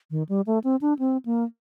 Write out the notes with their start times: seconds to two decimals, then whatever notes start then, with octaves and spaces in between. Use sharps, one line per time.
0.11 D#3
0.29 G3
0.47 A3
0.64 C4
0.81 D4
0.99 C4
1.26 A#3